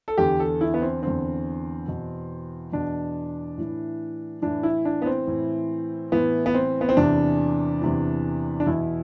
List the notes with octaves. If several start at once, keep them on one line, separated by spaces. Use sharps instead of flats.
A4
E2 D3 G4
A4
E4
B3
C4
E2 D3 C4
E2 B2
E2 B2 D4
A2 E3
A2 E3 D4
E4
D4
B3
C4
A2 E3
A2 E3 B3
B3
C4
B3
C4
E2 C3 E3 D4
E2 C3 E3
D4
E2 B2 E4